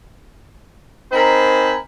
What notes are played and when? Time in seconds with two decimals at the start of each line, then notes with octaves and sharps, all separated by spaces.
1.12 C4 D#4 A#4 C5 G#5 B5